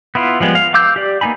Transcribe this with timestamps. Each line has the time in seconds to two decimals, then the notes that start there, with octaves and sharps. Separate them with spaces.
0.15 B3 E4 F4
0.40 F3 G3 G#3 B3
0.55 F5
0.74 F5 D6 E6 G6
0.96 G4 D5
1.21 A#3 B3 D#4 G#5 B5